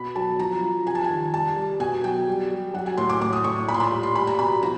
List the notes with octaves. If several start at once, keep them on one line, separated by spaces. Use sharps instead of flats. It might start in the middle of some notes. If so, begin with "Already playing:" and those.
Already playing: B2 B5
F#3 A5
F3 A#5
F3
C3 G#5
A5
G#5
D#3
G3 A5
G3
B2 G#5
F#3 G5
G3
G3
F#3 F#5
G#5
A2 C6
D6
A2 D6
D#6
A2 C#6
A#2 B5
C6
B5
G3
C6
G3 B5
A#5
B2 B5
F3 A#5